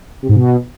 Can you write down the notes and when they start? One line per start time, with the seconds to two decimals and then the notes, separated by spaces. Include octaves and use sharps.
0.23 C3
0.29 G#2
0.36 B2